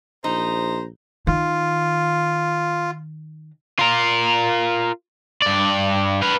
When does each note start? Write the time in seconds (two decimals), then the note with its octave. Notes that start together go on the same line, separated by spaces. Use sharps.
0.24 A#1 D#4 C5 A#5
1.27 D#3 F4
3.79 F4 A#4
5.42 G2 D5
6.22 B4 F5